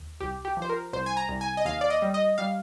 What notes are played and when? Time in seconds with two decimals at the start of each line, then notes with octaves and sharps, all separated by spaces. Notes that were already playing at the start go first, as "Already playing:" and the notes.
Already playing: D#2
0.20 C2 G4
0.45 G4
0.57 F3
0.62 C5
0.69 A#4
0.93 C2 C5
1.06 G#5
1.17 A#5
1.29 C2
1.41 G#5
1.57 D#5
1.65 D#2 F5
1.81 D5
1.90 D#5
2.02 G3
2.14 D#5
2.38 G3 F5